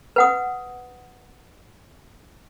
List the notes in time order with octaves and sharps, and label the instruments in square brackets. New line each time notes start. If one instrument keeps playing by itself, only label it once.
[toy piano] B4 F#5 D#6